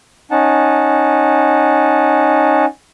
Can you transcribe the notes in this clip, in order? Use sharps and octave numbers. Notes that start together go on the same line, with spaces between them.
C#4 D#4 F#5 A5